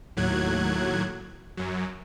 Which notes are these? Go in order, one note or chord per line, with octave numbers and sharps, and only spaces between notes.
D#2 A2 F#3 F#6 G#6
F#2 F#3